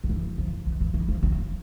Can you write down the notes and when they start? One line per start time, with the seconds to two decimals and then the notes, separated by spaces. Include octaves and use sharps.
0.04 D#3
0.09 E3
0.38 F3
0.66 E3
0.80 E3
0.94 E3
1.08 F3
1.23 F#3